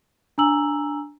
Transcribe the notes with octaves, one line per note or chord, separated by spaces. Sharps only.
D4 G#5 A#5 E6 F#7